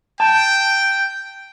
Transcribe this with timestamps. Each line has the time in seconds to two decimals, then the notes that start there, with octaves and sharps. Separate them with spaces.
0.20 G5 A5